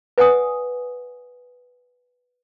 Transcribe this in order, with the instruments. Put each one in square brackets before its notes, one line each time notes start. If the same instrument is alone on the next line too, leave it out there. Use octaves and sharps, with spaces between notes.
[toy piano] B4 D5 F#5 G#5 D#6